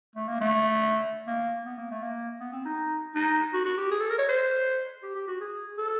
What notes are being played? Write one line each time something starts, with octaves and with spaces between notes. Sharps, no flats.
A3
A#3
A3
A#3
B3
A#3
A3
A#3
B3
C4
D#4
D#4
F#4
F#4
G4
G#4
A4
A#4
C#5
C5
G4
G4
F#4
G#4
A4